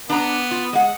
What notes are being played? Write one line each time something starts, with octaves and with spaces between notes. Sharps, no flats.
B3 D4 A#5
F4
G#3 F#5